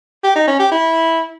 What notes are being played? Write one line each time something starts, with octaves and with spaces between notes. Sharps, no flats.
G4
D#4
C#4
G4
E4